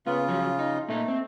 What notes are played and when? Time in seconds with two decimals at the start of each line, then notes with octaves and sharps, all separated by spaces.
0.07 C#3 B3 F4
0.29 F3 F#3
0.59 D#4
0.88 A#2 A3 D#4
1.08 C4